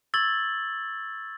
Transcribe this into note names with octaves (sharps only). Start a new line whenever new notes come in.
C#6 E6 G#6 A6 F#7 G7